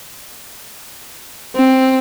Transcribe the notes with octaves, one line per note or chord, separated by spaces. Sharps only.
C4